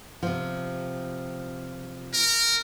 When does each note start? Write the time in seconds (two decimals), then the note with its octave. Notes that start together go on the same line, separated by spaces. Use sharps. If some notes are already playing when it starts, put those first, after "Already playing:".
0.23 C3 F3
2.13 A#4